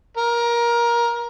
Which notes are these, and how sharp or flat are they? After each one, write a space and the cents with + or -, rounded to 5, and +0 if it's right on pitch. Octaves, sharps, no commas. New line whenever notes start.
A#4 +20